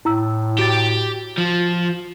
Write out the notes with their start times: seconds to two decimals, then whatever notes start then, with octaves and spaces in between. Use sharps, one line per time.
0.05 A2 E4 A#5 E6
0.59 F#4 G4 A6
1.38 F3 F4